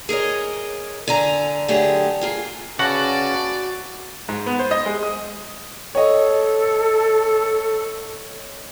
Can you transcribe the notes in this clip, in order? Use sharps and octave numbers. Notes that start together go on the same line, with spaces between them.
G#4 A#4 C#5 D#5
D3 G#5 A#5
D3 F#3 A3 G4 G#4
A#3 F4 G#4
C#3 C#4 F#4 B4 D5 F#5 A5
G#2
B3
C5
D#5
G#3
D#6
A4 C#5 D#5